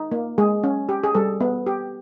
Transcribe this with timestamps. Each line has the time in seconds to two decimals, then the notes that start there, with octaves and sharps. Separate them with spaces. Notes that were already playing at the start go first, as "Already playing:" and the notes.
Already playing: D#4
0.11 A#3
0.38 G#3 G#4
0.64 C#4
0.89 G4
1.04 G#4
1.15 G3 A4
1.41 B3
1.66 G4